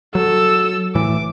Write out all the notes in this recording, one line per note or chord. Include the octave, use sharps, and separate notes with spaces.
F#3 A4 E6
A2 E3 D6